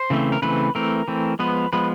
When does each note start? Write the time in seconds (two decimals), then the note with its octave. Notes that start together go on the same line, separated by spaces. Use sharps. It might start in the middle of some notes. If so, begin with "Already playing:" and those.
Already playing: C5
0.10 C#3 E3 A3 C4
0.32 A#4
0.42 C#3 E3 A3 C4 B4
0.75 E3 A3 C4 A#4
1.08 E3 A3 C4
1.39 F3 G#3 B3 B4
1.73 F3 G#3 B3 B4